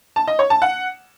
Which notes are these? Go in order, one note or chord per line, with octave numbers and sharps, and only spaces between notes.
A5
D#5
C#5
A5
F#5